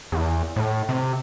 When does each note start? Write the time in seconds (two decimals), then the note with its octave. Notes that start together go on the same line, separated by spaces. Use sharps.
0.12 E2
0.56 A2
0.89 C3